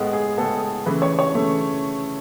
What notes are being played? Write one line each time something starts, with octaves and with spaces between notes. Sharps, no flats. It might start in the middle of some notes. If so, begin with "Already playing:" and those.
Already playing: A2 G#3 B3
G#4
A2 G#3 B3 A4
C#3 E3 A3 B4
C#5
C#5
C#3 E3 A3